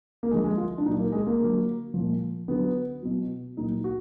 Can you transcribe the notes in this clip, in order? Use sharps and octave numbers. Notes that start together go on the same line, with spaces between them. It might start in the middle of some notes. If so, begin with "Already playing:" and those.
A#3
D3 F3 G#3
G#3
F4
D4
A#2 F#3 D#4
A#3
G#3
A#3
D3 F#3
A#2 F3
D3 F#3 B3
B2 F#3
A#2 F#3 D#4
F#4